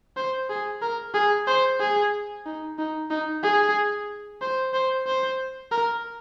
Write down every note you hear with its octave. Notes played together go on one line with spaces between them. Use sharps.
C5
G#4
A#4
G#4
C5
G#4
D#4
D#4
D#4
G#4
C5
C5
C5
A#4